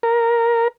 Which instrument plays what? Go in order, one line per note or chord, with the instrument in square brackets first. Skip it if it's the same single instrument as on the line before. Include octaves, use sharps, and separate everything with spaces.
[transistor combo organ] A#4